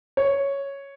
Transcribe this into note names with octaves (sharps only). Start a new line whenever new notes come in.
C#5